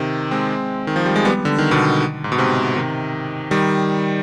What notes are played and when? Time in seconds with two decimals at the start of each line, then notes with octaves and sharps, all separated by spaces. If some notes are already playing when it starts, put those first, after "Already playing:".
Already playing: C3 D#3
0.31 G#3 C4
0.87 D#3
0.96 F3
1.06 G3
1.16 G#3
1.25 G3 B3
1.45 D3
1.58 D#3
1.71 B2 D3
2.24 G#2
2.32 B2
2.38 G#2 C3
2.76 C3 D#3
3.51 D#3 G3